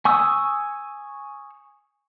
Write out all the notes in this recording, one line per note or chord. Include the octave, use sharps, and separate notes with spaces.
G#5 C#6 D#6 E6